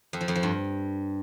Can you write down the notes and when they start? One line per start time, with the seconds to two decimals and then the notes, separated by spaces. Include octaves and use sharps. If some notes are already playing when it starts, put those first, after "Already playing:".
0.13 F2
0.21 F3
0.28 F2
0.35 F3
0.43 G2